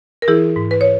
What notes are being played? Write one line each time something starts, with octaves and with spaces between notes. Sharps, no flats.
A#4
E3 E4 G#4
G#2
B4
C#5